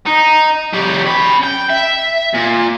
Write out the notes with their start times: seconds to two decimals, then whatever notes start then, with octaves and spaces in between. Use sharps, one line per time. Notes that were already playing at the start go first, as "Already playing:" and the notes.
0.06 D#4
0.74 F#3 G4
1.06 C#4 B5
1.44 G5
1.70 E5
2.34 A#2